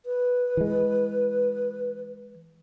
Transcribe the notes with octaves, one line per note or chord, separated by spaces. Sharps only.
B4
E3 G#3